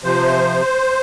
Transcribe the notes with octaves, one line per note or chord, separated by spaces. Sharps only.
C3 F3 C5